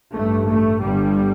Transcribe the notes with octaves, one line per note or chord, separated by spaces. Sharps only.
A1 G2 A3
A3
G1 G2 G3